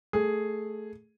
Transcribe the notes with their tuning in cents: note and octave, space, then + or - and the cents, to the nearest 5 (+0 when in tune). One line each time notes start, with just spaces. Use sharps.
A3 +0 G#4 +0